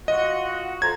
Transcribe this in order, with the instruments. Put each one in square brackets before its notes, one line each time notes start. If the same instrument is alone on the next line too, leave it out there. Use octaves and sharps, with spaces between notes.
[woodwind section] F4 F#4 F#5 [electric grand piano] D#5
[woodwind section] F2 F4 A#5 [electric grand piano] G#6